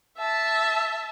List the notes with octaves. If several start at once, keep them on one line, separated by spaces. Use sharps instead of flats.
E5 A5